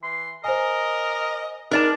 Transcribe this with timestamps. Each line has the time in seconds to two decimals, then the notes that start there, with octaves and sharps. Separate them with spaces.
0.03 E3 C6
0.44 A#4 C5 D#5 G#5
1.71 G#3 D4 D#4 A#4 B4 D5 A5